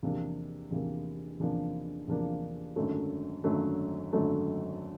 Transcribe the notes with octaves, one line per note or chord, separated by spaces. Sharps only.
E2 C3 F3 A#3 D4
E2 C3 F3 A#3 D4
E2 C3 F3 A#3 D4
E2 C3 F3 A#3 D4
G#1 F#2 D3 F#3 A3
G#1 F#2 D3 F#3 A3
G#1 F#2 D3 F#3 A3